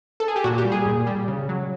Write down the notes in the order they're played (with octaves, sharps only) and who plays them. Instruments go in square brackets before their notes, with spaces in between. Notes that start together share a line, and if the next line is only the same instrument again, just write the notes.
[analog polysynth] A4
G#4
G4
A#2 F#4
G4
G3
G#4
A#2
G3
C#3
F#3